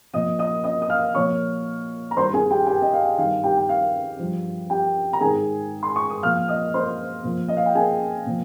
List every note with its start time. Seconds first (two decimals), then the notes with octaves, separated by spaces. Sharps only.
0.13 A#2 F3 D#5 D#6
0.39 D#5 D#6
0.64 D#5 D#6
0.82 D#6
0.90 F5 F6
1.15 A#2 F3 C#5 C#6
2.11 A#5
2.17 G2 D#3 C5 C6
2.34 G#4 G#5
2.50 G4 G5
2.67 G4 G5
2.82 D#5
2.93 F5
3.18 G2 D#3 F5
3.43 G4 G5
3.57 G5
3.69 F5
4.19 G2 F3
4.70 G4 G5
5.13 A#5
5.21 G#2 D#3 G#4 G#5
5.83 C6
5.96 C#6
6.10 D#6
6.23 A#2 F3 F5 F6
6.48 D#5 D#6
6.74 C5 C6
7.24 A#2 F3
7.48 D#5
7.57 F5
7.66 G5
7.75 G#4 G#5
8.26 A#2 F3